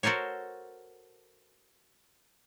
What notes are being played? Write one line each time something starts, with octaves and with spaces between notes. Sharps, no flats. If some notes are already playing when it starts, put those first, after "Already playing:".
F#4 A4 A#4 C5 C#5